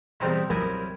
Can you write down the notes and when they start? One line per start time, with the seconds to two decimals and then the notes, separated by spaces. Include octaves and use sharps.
0.20 E2 C3 G3 C4 D#4 E4
0.50 C2 F#2 E4 A#4 G#5